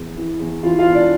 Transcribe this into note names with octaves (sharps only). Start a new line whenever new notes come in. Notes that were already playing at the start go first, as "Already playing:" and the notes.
Already playing: E2
E3
E2
E3 F4 F5
F4 F5
E1
D4 D5